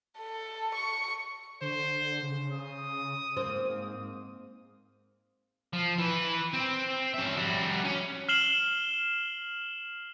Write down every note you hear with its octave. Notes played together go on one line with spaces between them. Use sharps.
A4
C#6
D3 C5
C#3
D#6
G#2 A#3 C4 C5
F3
E3 B4
C4
C#4 E5
G3 F#4
C#4
F6 C7 E7 F#7 G7